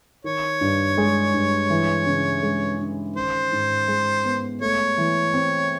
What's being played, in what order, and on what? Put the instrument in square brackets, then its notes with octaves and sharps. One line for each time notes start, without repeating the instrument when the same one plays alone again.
[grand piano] D#3 [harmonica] C#5
[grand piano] G2
G#3
G2
E3
C#3
G#3
C#4
[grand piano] D#3 [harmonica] C5
[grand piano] G#2
G#3
B3
[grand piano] A3 [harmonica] C#5
[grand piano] E3
C4